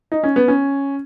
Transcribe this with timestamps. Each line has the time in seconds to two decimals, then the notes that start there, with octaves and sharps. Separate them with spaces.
0.12 D#4
0.23 C#4
0.36 B3
0.48 C#4